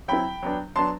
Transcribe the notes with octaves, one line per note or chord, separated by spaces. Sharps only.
F#3 C4 E4 G5 B5
F#3 B3 D4
F#3 B3 D4 A5 C6